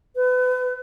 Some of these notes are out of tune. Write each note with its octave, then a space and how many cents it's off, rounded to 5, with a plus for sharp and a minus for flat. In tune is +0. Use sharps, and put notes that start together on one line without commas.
B4 +35